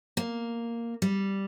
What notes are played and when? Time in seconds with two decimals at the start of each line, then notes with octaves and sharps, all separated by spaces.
0.17 A#3
1.02 G3